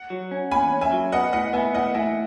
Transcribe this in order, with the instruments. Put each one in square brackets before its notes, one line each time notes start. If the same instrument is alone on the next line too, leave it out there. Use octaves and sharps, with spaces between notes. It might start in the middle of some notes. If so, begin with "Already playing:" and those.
Already playing: [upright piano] F#5
[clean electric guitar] F#3
C#4
[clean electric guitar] E2 [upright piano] G#5 B5
[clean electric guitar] C#4
[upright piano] E5 G#5
[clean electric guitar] F#3
[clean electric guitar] B3 [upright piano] D#5 F#5
[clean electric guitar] A2 [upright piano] D#5 F#5
[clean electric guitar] B3 [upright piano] E5 G#5
[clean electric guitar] A2 [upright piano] D#5 F#5
[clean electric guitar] A2 [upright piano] E5 G#5